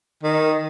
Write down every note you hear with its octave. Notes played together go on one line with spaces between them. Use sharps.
D#3